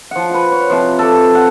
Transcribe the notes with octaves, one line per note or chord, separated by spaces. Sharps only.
F3 F#5
B4 F#5
C#5
C3 F3
A4 D6
F#5